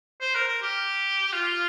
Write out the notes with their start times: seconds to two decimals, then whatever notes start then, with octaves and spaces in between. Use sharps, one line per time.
0.21 C5
0.34 A#4
0.48 A#4
0.62 G4
1.32 F4